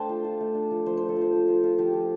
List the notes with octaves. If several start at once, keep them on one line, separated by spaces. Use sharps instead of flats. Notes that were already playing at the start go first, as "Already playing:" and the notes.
Already playing: A3 D4 C5 F5 G5 A5
F4
F4
A3
D4
F3
F3 C5
F3 C5
A4
F3 C5
F3
F4
F4
F3 G4
F3